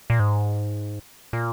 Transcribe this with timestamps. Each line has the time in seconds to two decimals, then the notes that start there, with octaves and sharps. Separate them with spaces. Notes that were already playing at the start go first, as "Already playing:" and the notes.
0.10 A#2
0.20 G#2
1.33 A#2